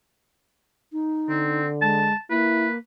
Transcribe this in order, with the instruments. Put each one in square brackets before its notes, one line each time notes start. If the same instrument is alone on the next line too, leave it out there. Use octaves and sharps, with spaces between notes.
[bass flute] D#4
[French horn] D3 [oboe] C4
[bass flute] G#3 [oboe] A5
[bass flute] A#3 [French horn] E4 [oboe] B4